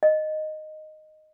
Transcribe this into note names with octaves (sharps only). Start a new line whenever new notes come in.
D#5